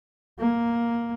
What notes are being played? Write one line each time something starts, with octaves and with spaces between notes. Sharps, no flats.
A#3